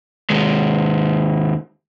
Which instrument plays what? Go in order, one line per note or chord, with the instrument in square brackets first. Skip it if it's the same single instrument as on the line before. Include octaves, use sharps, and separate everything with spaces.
[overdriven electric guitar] D#2 G#3